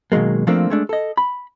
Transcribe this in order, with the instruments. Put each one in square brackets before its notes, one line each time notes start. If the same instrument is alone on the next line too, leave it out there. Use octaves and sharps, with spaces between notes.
[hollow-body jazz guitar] B2 D#3 F#3 G#3 A#3
F3 A3 A#3 C4 D4
G#3 A3 D4
A4 D#5
B5